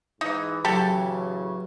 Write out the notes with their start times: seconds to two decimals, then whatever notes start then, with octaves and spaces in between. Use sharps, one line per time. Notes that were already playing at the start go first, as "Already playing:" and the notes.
0.21 G#2 E3 D#4
0.65 A1 C#3 E3 F#3 G4 A4